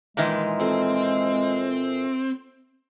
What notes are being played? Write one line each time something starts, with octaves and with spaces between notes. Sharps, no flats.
A#2 D#3 E3 G#3
C4 F4 A4 E5